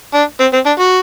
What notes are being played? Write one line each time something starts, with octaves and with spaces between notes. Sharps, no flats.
D4
C4
C4
D4
F#4